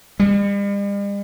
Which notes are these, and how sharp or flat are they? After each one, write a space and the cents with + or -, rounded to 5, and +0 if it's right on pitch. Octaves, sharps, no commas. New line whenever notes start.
G3 +45